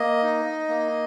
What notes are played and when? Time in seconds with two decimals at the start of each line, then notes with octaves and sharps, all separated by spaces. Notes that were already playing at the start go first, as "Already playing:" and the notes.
Already playing: A#3 D#5
0.23 D#4
0.68 A#3